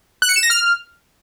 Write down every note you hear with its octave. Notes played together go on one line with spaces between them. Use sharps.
F#6
C#7
E7
A#6
F6